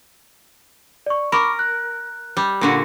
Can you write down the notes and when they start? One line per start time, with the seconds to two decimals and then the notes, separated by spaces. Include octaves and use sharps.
1.06 D5 C#6
1.32 A#4 B5 C#6 D6
1.59 F#6
2.37 G3
2.61 A#2 D3 F#4